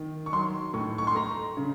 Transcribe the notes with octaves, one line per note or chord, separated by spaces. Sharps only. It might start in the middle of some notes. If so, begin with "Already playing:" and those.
Already playing: D#3
C#6
F#3 C6
A2 C#6
C#6
C6
A3 A#5
C#3